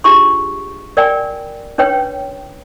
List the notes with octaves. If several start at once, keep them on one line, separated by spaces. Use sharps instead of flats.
D4 F4 G4 G#4 C6 C#6
A#4 D5 G5 G#5
C#4 D4 B4 C#5 G5